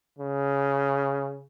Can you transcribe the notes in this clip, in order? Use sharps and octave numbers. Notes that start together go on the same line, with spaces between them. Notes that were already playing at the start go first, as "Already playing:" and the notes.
C#3